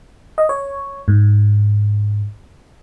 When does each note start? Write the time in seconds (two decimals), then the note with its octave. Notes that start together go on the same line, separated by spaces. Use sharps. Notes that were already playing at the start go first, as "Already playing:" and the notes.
0.38 D#5
0.49 C#5
1.08 G#2